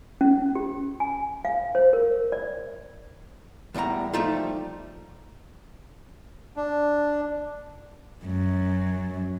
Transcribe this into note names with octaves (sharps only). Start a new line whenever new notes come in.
C#4
G4
G#5
F5
C5
A#4
D5
E2 A2 G3 F#5 A#5
F3 G3 A3 D#4 F4
D4
F#2